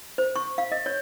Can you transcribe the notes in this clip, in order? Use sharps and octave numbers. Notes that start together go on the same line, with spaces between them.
C5
C#6
F5
D#5
C#5